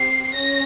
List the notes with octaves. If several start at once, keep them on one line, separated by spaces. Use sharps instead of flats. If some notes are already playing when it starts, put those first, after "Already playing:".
Already playing: C4 G4 C7
C#4 A#6